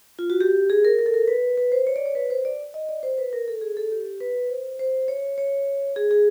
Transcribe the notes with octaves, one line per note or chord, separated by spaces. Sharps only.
F4
F#4
G4
G#4
A#4
A#4
A4
A#4
B4
B4
C5
C#5
D5
C#5
B4
C5
D5
D#5
D5
C5
B4
A#4
A4
G#4
A4
G4
B4
C5
C5
C#5
C#5
G#4
G#4